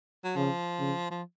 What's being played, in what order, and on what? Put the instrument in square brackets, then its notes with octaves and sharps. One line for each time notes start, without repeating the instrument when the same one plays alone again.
[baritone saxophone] F#3
[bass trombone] C#3 [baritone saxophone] F3
[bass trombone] C#3
[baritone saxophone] F3